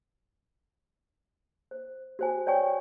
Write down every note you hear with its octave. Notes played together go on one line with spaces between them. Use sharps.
C5
F#4 C5 G#5
C#5 D5 G5 G#5 C#6